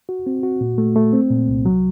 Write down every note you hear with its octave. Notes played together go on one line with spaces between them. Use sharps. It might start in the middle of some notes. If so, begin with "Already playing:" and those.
F#4
C4
F#4
A#2
A3
A3
C4
A#2
C2
F#3